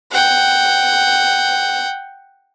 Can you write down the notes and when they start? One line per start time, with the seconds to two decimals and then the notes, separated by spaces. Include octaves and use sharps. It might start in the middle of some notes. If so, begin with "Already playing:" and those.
0.12 F#5 G5